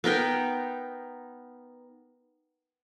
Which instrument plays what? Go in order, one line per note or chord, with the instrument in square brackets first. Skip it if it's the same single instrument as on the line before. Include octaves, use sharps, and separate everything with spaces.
[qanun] B3 D#4 A#4 G5